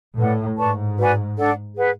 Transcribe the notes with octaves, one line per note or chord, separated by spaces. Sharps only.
A2 B4 D5 F#5
G#2 B4 D5 A5 C#6
F#4 B4 D5 G#5
D4 A4 D5 F#5
G#4 B4 F#5